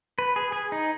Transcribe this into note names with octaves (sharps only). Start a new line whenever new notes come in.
B4
G#4
G#4
D#4